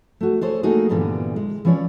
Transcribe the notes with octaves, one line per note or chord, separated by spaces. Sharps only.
A3 F#4
G#4 A4 C5 C#5
A3 A#3 D#4 F#4 G#4
G2 A#2 D3 E3 G3 B3
G#3
E3 F3 C#4 C#5 D5